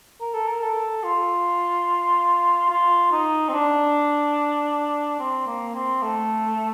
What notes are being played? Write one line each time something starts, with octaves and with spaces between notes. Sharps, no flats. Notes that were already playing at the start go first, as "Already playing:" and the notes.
A#4
A4
A#4
A4
F4
F4
D#4
C4
D4
C4
A#3
C4
A3